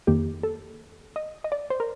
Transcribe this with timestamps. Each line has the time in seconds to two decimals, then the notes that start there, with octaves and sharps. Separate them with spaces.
0.07 F2 D#3 A#3 G4
0.43 A4
1.16 D#5
1.44 D#5
1.52 D5
1.70 C5
1.80 A#4